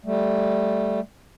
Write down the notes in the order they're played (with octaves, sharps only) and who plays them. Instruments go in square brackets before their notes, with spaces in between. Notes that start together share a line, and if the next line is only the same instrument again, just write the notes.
[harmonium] G3 A3